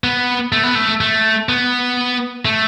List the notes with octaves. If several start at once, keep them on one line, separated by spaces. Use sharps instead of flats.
B3
A3
B3
A3
A3
B3
A3